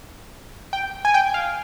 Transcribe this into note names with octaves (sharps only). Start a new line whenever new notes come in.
G5
G#5
G5
F5